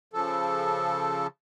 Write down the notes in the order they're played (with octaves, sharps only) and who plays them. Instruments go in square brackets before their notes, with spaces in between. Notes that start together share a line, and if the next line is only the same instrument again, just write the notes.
[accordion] C#3 F3 A4